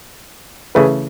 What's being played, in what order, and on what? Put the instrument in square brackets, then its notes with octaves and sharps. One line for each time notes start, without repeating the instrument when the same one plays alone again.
[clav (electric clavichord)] C#3 E3 A3 [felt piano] G#4 B4